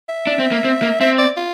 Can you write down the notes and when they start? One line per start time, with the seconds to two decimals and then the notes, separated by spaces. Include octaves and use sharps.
0.09 E5
0.27 D4
0.39 C4
0.51 A#3
0.64 C4
0.82 A#3
1.00 C4 E5
1.18 D5
1.37 F4